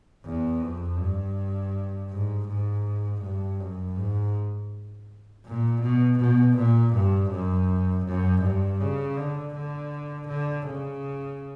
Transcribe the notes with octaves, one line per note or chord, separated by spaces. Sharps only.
E2
F2
G2
G#2
G#2
G2
F#2
G#2
A#2
B2
B2
A#2
G2
F#2
F#2
G2
C#3
D3
D3
D3
C#3